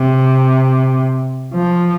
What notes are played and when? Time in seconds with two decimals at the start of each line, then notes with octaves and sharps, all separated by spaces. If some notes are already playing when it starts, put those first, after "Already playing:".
Already playing: C3
1.53 F3